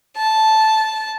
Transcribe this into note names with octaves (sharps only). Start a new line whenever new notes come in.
A5